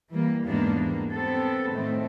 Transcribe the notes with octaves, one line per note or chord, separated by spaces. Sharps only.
E3 G3 A#3
E2 G#2 D#3 A#3 B3 D4
G3 A#3
B3 C4 A4
A2 D#3 A3 C4